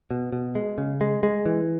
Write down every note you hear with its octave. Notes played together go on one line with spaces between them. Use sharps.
B2
B2
G#3
C#3
G#3
G#3
E3